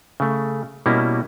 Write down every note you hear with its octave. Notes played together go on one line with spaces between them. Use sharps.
C#3 A3
B2 G3 A#3 C#4 E4